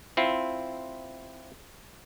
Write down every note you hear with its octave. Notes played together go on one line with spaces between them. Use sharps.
C4 E4 F4